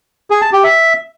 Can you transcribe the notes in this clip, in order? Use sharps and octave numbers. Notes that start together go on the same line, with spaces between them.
G#4
A5
G4
E5